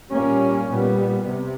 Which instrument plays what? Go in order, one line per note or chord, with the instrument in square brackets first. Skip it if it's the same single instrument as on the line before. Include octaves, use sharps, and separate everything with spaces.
[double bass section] A#2 G3 A#3 C#4
A#2 G3 B3
C3